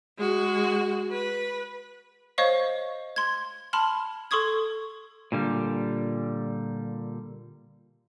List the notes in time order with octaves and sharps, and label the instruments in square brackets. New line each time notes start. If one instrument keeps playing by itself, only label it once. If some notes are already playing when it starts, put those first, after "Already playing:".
[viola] G#3 F#4
B4
[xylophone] C5 C#5 D#5 F5 C#6
C6 G#6
A5 B5 C6 F6
A4 C6 C#6 D#6 G#6
[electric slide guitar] A#2 D3 G3